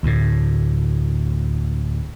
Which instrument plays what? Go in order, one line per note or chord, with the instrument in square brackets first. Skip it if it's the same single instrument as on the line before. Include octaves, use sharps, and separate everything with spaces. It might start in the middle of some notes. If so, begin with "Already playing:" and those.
[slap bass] D2 A2